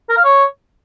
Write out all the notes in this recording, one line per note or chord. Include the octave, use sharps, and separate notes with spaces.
A#4
F5
C#5